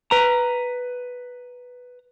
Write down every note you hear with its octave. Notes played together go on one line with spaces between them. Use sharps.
B4 A#5